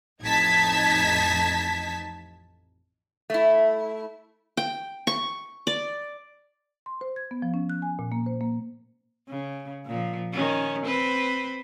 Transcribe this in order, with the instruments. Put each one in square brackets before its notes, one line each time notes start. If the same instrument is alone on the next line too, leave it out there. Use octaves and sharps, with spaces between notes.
[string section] A1 F2 D#4 A5 G#6 B6
[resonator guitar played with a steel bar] A3 E4
[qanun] G5
C#6
D5
[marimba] C6
C5
G#6
B3
F3
C#4
F#6
G#5
A#2
A#3
C5
A#3
[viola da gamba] C#3
A#2 F3
D#3 C#4
C4 B4 C5